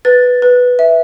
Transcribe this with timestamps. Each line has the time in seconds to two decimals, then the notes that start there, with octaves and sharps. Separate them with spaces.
0.05 B4 A6
0.42 B4
0.79 E5